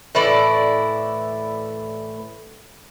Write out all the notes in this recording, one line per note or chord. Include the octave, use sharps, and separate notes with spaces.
A2 E3 E4 D5